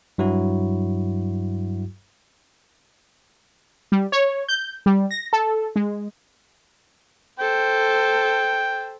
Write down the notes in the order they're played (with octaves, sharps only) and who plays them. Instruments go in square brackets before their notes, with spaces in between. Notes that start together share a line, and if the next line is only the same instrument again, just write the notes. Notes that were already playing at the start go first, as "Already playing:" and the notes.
[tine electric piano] G2 F#3 E4 F#4
[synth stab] G3
C#5
G6
G3
A#6
A4
G#3
[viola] A4 C5 [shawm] G5